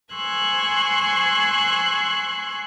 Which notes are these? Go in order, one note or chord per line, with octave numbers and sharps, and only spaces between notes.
G#5 C6 C#6 E6 F#6 G#6